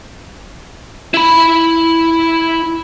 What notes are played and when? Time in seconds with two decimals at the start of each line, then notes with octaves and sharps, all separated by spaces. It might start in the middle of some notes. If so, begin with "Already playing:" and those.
1.14 E4 B5